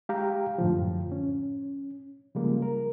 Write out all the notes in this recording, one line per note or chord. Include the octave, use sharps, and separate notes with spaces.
G#3 G4 F5 G5 A#5
F#2 A2 D3 F3
C#4
C#3 F3 G3 G#3 A#3
A#4